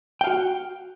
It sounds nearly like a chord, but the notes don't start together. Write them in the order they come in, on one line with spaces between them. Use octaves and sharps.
G5 F5 F#4